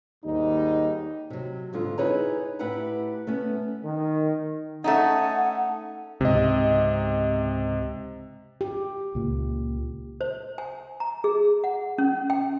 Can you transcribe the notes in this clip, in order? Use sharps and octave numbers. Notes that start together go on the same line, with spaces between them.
D#2 G#2 G3 D#4
C3 F#3
F2 G#2 D3 F4
D#4 E4 G#4 B4 C#5 A#5
A2 E4 G4 B4 F#5 A#5
A3 B3 C#4
D#3
A3 C#4 D#4 F#5
C#2 G#2 C3 D#5
G4
C#2 A#2
C5
G#5
A#5
G#4
F#5
C#4
G5